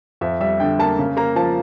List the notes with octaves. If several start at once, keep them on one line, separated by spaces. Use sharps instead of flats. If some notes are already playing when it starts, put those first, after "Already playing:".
F2 E5
G3 E5
D3 G5
A#3 A5
C#3
A#3 A#5
F3 A5